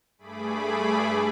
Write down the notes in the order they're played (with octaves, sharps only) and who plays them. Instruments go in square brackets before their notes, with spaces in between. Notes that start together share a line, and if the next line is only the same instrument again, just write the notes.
[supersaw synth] G2 A3 G#4 B5 D6